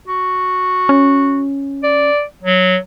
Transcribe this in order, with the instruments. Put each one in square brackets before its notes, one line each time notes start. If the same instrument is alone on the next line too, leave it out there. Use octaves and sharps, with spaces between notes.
[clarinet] F#4
[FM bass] C#4
[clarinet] D5
F#3